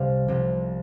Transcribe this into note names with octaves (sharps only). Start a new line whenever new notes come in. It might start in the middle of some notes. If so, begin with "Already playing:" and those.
Already playing: C2 C3 G3 F5
C2 C3 F3